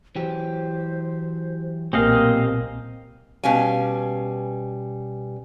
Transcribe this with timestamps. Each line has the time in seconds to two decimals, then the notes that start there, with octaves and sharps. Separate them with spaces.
0.16 E3 F#3 G4 C5
1.93 B1 A#2 A#3 C4 G4 D#5 F5 G#5
3.44 B2 G3 C#4 F5 G#5